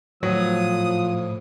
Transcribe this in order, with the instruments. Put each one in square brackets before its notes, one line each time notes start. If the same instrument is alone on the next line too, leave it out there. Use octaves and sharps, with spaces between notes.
[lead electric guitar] A2 [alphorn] F3 [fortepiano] F#3 [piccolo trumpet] D#6